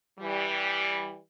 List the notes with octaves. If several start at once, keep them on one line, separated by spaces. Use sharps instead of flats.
E3 G3